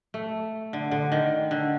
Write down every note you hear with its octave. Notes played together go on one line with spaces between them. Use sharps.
A3
D3
D3
D#3
D3